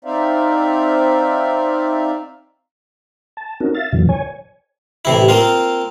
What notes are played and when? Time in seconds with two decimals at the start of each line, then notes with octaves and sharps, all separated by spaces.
0.05 C4 D#4 C5 D5 E5 F5
3.37 A5
3.60 C4 C#4 D#4 F#4 A#4
3.75 E5 F5 A6
3.92 F2 A#2 D3 E3 F#3
4.09 C#5 G#5
5.05 A1 C3 E4
5.29 A#3 C4 F4